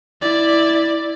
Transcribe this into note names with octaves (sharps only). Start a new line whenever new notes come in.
E4 D5